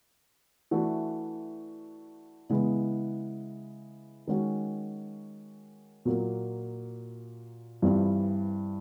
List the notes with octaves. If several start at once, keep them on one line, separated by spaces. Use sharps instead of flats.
E3 A3 D4 F#4
C#3 E3 G#3 B3 E4
D#3 G#3 C#4 F#4
A#2 F#3 A#3
G2 E3 G3 C4 F4